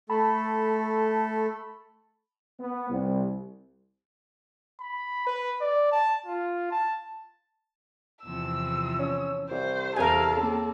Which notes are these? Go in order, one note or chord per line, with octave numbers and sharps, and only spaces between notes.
A3 A4 A5 B5
B3
C2
B5
B4
D5
A5
F4
A5
E2 C3 F3 E6
C#4
C2 C5
E2 C3 A4 A#4 F5 G#5
C#3 A#3 C4